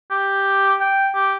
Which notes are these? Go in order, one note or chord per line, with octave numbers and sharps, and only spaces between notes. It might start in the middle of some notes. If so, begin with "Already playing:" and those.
G4
G5
G4